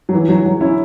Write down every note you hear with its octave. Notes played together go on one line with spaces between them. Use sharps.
F#3
E3
F#3
F#3
C#4 E4